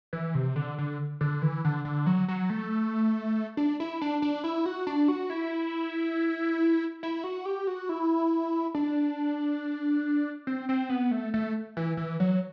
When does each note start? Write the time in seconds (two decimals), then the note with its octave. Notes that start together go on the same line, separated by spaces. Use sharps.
0.13 E3
0.35 C3
0.56 D3
0.78 D3
1.21 D3
1.42 E3
1.65 D3
1.85 D3
2.06 F#3
2.28 F#3
2.50 A3
3.57 D4
3.80 E4
4.01 D4
4.22 D4
4.44 E4
4.66 F#4
4.87 D4
5.08 F#4
5.30 E4
7.03 E4
7.24 F#4
7.45 G4
7.67 F#4
7.89 E4
8.75 D4
10.47 C4
10.69 C4
10.90 B3
11.11 A3
11.34 A3
11.77 E3
11.97 E3
12.20 F#3